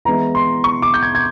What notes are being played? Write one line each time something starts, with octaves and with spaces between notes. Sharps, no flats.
E3 G#3 B3 E4 A#5
C6
C#6
D6
G6
G#6
G#6